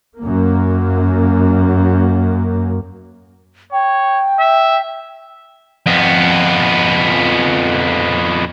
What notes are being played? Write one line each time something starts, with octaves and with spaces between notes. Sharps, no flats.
F#2 A#3
C#5 G5
E5
F2 B3